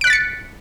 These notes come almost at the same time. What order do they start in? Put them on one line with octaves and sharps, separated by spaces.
D7 F#6 B6 A6 C#7